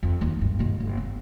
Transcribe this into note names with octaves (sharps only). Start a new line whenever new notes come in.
F2
D#2 F#3
G2
B1 A#3
G1
B3